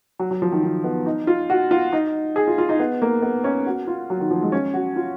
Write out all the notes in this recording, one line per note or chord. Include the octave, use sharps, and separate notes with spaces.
F#3
F#3
F3
D#3
D#3
B3
D#4
F4
F#4
F4
D#4
G#4
F4
F4
D#4
B3
A#3
B3
C#4
F#4
F4
F#3
D#3
F3
G#3
C#4
F#4
F4